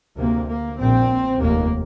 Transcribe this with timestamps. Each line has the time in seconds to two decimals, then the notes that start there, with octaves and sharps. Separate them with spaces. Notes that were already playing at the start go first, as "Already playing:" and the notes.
0.18 D2 C3 A#3
0.48 A#3
0.79 A#1 A#2 C4
1.41 F1 D#2 A#3